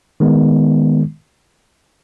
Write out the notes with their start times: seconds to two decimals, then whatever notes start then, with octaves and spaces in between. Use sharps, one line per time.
0.20 D#3 G#3 B3